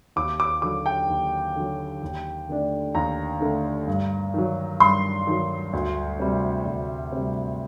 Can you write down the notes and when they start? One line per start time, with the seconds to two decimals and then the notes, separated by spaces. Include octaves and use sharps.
0.16 D#2 D6
0.40 D6
0.62 D3 F#3 D6
0.86 G5
1.09 D#2
1.56 D3 F#3
2.02 D#2
2.49 D3 A3 D4
2.94 D#2 A#5
3.41 D3 A3 D4
3.87 G2
4.34 D#3 F#3
4.80 G2 C6
5.27 D#3 F#3
5.73 D2
6.20 C3 G3
6.66 D2
7.12 C3 G3